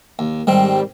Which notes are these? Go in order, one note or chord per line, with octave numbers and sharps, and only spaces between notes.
D#2
G#2 D#3 G3 C4